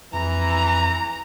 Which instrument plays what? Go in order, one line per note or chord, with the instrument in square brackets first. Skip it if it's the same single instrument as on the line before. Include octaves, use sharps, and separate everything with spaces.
[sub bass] F2 [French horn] E3 [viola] A#5